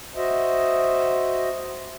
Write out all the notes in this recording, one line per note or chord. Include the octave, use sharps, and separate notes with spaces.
F#4 C5 D#5 E5